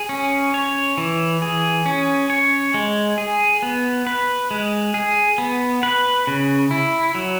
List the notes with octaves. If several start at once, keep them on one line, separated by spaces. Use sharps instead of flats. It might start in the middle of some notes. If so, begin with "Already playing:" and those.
Already playing: G#4
C#4
C#5
E3
G#4
C#4
C#5
G#3
G#4
B3
B4
G#3
G#4
B3
B4
C#3
E4
F#3